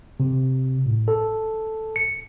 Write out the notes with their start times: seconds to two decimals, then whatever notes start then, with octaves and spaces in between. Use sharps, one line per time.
0.20 C3
0.86 A2
1.08 A4
1.96 C#7